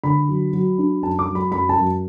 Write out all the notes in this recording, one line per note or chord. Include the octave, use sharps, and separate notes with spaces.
D3 B5
F#3
F#3
D4
F#2 A5
D6
F#3
B5
F#2 B5
A5
F#2